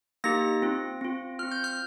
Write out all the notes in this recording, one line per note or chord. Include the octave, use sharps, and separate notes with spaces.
A#3 D#4 G4 A#6
C4 F4
C4 F4
C4 F4 F6
G6
F6